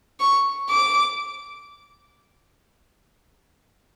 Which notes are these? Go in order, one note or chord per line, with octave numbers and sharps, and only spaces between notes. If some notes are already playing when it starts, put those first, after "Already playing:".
C#6
D6